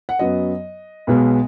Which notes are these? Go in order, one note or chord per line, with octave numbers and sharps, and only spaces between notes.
F#5
F#2 F#3 B3 D#5
B1 B2 G#3 B3